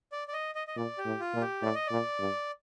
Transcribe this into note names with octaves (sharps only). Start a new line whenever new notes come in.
D5
D5
D#5
D#5
D#5
A#2 D5
G4
A2
F4
A#2
G4
A2 D5
D#5
A#2 D5
G2